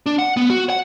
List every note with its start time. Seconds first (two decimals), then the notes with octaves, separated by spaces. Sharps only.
0.06 D4
0.19 F#5
0.37 B3
0.50 F#4
0.70 F#5